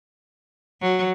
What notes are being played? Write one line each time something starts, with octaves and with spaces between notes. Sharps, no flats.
F#3